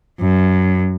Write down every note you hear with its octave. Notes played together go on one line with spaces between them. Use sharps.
F#2